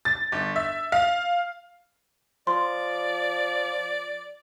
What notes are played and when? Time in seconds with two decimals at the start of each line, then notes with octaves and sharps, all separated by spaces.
0.05 A6
0.32 G1
0.56 E5
0.92 F5
2.47 F3 D5 C6